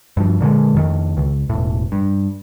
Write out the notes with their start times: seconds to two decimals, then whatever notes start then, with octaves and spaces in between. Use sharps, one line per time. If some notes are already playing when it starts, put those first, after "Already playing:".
0.17 G2 F3
0.40 A#2 D3 F#3 G#3
0.74 F2 D#3
1.17 C#2
1.50 E1 A2
1.92 G2